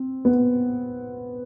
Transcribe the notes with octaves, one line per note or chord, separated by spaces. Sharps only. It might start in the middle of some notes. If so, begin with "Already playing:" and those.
Already playing: C4
B3